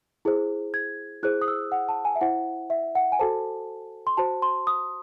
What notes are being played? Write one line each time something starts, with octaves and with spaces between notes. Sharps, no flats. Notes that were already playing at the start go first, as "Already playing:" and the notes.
E4 G#4 C5
G#6
E4 G#4 C5 F#6
D#6
E6
F#5
A5
G#5
E5
E4 C5 F#5
E5
F#5
G#5
F#4 A4 C5 A5
C6
F#4 C5 A5
C6
D#6